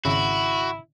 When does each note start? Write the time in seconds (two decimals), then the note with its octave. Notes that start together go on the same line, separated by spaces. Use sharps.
0.05 G#1 C#3 E4 F#4